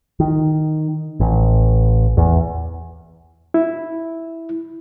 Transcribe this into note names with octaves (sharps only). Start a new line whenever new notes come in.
D#3
A1
E2
E4